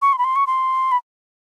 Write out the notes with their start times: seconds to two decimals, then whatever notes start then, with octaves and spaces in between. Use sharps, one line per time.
0.02 C#6
0.13 C6
0.18 B5
0.24 C6
0.36 C#6
0.47 C6
0.92 B5